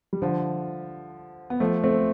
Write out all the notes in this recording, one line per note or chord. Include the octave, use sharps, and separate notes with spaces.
G3
D3 F3
B3
F3 A3
A3 C4